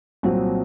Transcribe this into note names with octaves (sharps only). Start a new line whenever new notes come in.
C2 A#2 F#3 C4